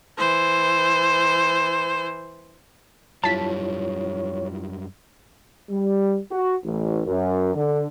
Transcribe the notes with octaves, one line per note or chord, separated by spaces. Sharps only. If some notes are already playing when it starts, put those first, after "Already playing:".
E3 C5
F#2 G3 E4 F4 C#5 A5 B6
G3
F#4
A1
F#2
D3